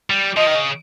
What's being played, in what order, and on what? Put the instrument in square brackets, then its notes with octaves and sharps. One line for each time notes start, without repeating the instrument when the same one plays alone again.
[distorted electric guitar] G3
[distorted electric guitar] F3 [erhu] D#5
[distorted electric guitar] D#3
C#3